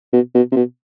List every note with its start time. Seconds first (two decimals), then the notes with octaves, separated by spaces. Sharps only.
0.13 B2
0.35 B2
0.51 C3
0.56 B2